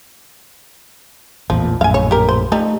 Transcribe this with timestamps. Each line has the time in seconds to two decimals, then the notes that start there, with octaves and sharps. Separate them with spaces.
1.50 A1 E2 A#2 F3
1.81 A#1 F#2 A2 F5 G#5
1.94 C#5
2.11 G4 A#4
2.29 C5
2.52 F3 G3 A3 D#4